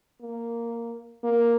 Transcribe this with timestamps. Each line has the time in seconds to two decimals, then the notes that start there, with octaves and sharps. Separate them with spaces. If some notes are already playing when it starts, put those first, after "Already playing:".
0.22 A#3
1.24 A#3